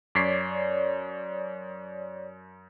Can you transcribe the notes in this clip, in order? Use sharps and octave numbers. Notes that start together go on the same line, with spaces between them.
F#2 C#5 D5 B6 C7